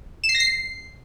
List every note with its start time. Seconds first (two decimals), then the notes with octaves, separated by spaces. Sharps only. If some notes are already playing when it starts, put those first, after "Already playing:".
0.24 E7
0.29 C7
0.35 A#6
0.40 C7